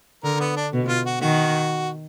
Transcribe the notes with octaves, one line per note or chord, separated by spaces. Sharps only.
D3 A#4
B3
D4
B2
F4
F#4
D#3 F#4